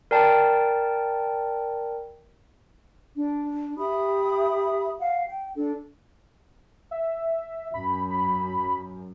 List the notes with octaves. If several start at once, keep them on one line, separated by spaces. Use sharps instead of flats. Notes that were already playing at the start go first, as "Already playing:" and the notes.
A#4 D5 G5 A5
D4
G4 E5 B5 D#6
F5 F#5
G5
D4 A4
E5
F#2 B5
B5